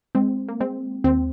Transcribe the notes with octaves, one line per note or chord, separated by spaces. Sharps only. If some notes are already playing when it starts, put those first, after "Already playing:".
G#3 C4
A#3
G#3 C4
D#2 C4